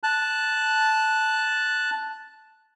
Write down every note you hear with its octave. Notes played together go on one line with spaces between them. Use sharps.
A5 F#6